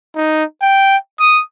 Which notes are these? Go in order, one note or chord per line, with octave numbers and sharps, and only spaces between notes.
D#4
G5
D#6